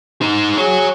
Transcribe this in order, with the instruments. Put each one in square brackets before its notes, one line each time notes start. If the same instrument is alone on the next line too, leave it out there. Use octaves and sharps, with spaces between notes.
[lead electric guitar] D#4 C5
[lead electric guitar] F#4 C#5 [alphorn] G#4